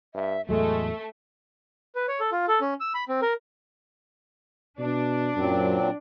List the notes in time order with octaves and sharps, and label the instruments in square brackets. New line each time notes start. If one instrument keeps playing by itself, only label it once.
[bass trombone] G2 [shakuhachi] E5
[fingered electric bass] E2 A2 F#3 [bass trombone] G#3 [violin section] A3 [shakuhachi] A4
[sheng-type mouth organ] B4
C#5
A4
F4
A4
C#4
E6
B5
C4
A#4
[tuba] B2 [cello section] D4
[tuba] F#2 [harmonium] A#2 F#3 C4